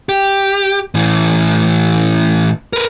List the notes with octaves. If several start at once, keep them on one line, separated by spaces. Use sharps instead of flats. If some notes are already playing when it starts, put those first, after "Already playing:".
G4
A2 E3
A#4 B4